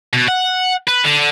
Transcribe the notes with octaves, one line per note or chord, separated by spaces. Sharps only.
B2
F#5
B4
D3